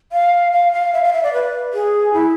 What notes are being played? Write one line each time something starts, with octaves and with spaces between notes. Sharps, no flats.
F5
F5
F5
E5
F5
E5
D5
B4
G#4
E4